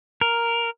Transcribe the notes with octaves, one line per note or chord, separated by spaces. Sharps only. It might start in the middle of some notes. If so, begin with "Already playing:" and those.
A#4